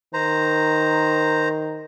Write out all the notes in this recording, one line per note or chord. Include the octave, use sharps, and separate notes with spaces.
D#3 C5 A#5